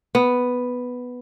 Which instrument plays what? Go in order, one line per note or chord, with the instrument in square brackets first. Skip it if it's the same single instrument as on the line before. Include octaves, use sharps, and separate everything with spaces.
[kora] B3